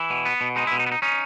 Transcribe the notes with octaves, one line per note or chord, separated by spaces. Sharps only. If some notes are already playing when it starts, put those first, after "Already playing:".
Already playing: E3 E4
B2
B3
B2
G#3 D#4
E4
B2
D#4
B3
D#4
C#4 D#4